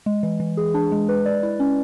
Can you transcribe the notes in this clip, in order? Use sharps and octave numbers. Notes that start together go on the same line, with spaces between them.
G#3
E3
E3
G#4
D4
G#3
B4
D5
E4
C#4